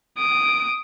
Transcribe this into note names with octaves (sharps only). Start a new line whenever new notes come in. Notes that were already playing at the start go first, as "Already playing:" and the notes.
D#6 D7